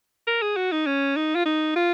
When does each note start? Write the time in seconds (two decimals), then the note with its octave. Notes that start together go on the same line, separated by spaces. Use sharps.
0.27 A#4
0.42 G#4
0.57 F#4
0.72 D#4
0.86 C#4
1.16 D#4
1.35 F4
1.45 D#4
1.76 F4